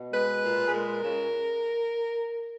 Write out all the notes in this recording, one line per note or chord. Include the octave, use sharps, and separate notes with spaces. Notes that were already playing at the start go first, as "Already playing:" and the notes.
Already playing: B2
G#3 B4
A#2
G#4
G#3 A#4
C#3